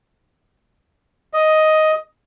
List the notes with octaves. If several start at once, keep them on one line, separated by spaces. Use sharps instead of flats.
D#5